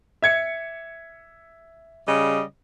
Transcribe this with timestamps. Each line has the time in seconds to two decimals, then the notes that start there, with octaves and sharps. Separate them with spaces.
0.22 E5 G#6 C#7
2.06 C#3 G3 D#5